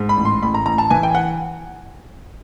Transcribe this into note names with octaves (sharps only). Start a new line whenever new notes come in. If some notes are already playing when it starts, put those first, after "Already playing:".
Already playing: G#2
B5
A1
C6
A1 B5
A#5
A1 A#5
A5
E3 G#5
G5
F#5